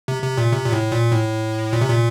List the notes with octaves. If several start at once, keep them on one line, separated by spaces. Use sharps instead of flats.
C3
C3
A#2
C3
A#2
A2
A#2
A2
A#2
C3
A#2